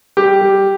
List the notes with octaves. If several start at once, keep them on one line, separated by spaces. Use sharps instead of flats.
G3 G4
G3